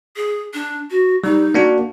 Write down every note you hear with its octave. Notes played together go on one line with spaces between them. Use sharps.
G#4
D4
F#4
G3 D#4
A#3 D4 F#4